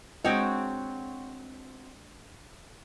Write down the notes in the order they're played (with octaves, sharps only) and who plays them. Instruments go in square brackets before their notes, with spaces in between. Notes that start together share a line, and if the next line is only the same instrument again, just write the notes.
[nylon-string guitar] G#3 D4 [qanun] C4 F#4 C#5 [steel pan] D#5 G5